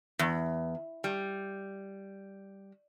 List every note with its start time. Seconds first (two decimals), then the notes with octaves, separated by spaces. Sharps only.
0.19 E2
1.04 G3